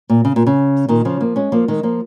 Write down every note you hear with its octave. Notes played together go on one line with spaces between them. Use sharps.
A#2
C#3
A#2
C#3
A#2 D#3
C#3 F3
F3 A#3
G#3 C#4
F3 A#3
D#3 G#3
F3 A#3